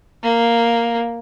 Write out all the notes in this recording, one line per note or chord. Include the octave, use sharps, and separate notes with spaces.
A#3